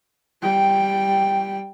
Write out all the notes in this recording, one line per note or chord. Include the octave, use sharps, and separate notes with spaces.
G3 G5